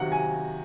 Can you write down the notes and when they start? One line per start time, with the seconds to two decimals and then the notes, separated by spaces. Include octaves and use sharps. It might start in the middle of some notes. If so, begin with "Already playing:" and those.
Already playing: C3 D#3 F#3 F#5
0.12 G#5